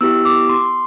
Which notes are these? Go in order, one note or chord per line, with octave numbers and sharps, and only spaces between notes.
B3 E4 G4 E6
D6
C6